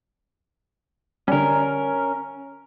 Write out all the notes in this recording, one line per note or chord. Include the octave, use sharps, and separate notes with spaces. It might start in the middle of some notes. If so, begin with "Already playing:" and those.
D3 G3 C#4 A#4